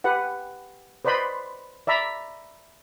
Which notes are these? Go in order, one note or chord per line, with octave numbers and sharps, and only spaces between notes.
G4 B4 F#5
B4 C5 D5 D#5 B5 C6
D5 E5 A#5 B5